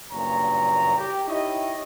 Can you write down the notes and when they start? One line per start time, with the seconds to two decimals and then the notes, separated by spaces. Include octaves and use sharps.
0.12 F#1 G2 A#2 C#5 A#5
0.98 G4
1.28 D#4 E4 G4 C#5 D#5